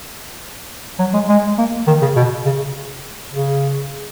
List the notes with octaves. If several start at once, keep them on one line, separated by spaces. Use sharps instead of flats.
F#3
G#3
G#3
A#3
D#3
C#3
B2
C#3
C#3